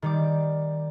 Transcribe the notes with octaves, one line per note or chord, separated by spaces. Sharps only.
D#3 G3 D6